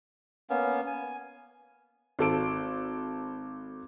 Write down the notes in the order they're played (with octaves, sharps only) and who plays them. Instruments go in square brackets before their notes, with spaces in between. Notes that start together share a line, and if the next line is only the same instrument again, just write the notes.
[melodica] A#3 B3 C#4
G#5
[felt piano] G#1 A4 D7